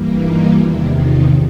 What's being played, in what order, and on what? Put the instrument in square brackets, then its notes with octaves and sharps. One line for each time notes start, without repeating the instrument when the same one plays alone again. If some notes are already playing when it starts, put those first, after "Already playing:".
Already playing: [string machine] G2 E3 G3 A#3
D#4 F4
E2 C3 D#3 D4 E4
D#4 F4